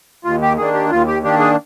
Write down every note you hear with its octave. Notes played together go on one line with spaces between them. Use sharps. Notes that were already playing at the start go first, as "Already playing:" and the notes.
D#2 F4
G4
D#3 A#3 D4 G#4
G4
D#2 F4
G4
D#3 A#3 D4 G4
G#4